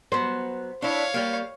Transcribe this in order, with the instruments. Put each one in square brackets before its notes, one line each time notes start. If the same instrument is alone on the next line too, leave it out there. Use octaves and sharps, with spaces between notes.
[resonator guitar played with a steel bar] F#3 B3 [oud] C5
[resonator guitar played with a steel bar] D4 E4 [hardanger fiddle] C#5 F5
[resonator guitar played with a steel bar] G3 A#3